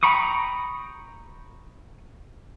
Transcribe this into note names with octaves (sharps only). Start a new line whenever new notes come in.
G5 A#5 B5 C#6 D#6